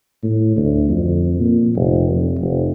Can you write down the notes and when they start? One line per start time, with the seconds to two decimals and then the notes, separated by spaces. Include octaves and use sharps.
0.23 A2
0.57 D2
0.89 F2
1.40 A#2
1.75 F1
2.09 F2
2.39 F1